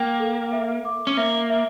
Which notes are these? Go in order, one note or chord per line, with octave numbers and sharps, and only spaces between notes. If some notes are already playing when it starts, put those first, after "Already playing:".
Already playing: A#3 G5
A4
E5
D6
C#4
A#3 E5
E5